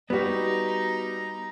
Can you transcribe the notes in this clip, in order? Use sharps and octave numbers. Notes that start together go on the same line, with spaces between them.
G3 B3 D#4 F#4 G4 A#5